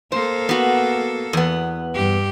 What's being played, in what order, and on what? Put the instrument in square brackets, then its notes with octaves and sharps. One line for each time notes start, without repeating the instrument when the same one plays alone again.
[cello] A#3 A4 [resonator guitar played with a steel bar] C5
[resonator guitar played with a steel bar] B3 F#4
E2 B3
[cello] G2 G4